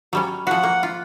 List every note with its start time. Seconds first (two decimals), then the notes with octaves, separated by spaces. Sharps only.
0.13 F#3 G3 C#4
0.47 F3 F#4 F#5
0.63 A#3
0.83 F4